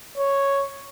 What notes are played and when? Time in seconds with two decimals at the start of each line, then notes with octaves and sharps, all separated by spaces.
0.17 C#5